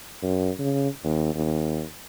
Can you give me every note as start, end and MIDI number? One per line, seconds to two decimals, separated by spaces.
0.22 0.50 42
0.59 0.88 49
1.04 1.31 39
1.34 1.84 39